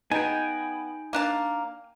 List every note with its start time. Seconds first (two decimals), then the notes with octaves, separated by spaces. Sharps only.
0.12 B3 D#4 G#4 G5 G#5
1.13 A#3 D4 A5